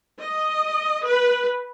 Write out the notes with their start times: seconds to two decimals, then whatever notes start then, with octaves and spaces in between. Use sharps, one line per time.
0.21 D#5
1.05 B4